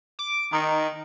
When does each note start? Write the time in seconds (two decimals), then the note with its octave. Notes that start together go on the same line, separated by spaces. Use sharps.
0.19 D6
0.53 D#3 D#4